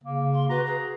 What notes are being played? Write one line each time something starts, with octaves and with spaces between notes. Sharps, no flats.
C#3 A#3
C6
F#4 B4 A#5
G#4